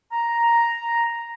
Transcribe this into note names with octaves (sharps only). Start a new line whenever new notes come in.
A#5